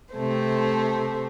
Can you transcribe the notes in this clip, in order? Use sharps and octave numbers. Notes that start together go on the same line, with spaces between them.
C3 A3 C5